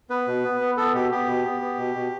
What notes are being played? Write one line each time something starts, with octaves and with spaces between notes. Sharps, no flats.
B3 B4
B2
B3
B3
B3 A4
B2 G4
B3 G4
B2
B3
B3
B2
B2